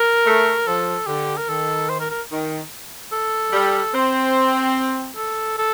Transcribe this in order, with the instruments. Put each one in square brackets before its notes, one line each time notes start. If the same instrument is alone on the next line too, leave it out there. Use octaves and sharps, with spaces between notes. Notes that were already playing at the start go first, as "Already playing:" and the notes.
Already playing: [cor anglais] A#4
[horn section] A3
[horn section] F3 [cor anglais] A4
[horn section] D3 [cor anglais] G4
[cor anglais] A#4
[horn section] D#3 [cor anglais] A4
[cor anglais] C5
A#4
A#4
[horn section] D#3
[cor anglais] A4
[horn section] G3
[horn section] C4 [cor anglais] C5
[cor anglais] A4
A4